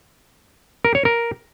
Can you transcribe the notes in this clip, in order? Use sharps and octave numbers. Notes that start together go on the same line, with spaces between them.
A#4
C#5
A#4